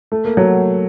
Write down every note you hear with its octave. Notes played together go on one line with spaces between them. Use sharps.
A3
A#3
F#3 A3